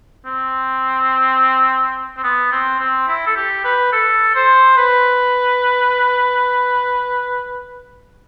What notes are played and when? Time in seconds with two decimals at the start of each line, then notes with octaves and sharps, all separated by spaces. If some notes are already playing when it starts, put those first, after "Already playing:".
0.26 C4
2.17 C4
2.24 B3
2.52 C4
2.80 C4
3.08 E4
3.27 A4
3.36 G4
3.65 B4
3.93 A4
4.35 C5
4.77 B4